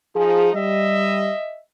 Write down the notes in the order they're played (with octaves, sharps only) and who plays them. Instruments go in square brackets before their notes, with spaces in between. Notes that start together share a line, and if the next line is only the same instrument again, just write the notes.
[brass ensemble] F3 D#4 [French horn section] G#4
[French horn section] G3 [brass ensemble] D#5 E5